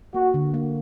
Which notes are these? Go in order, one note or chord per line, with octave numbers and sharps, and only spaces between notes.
A#3 F#4
D3
A#3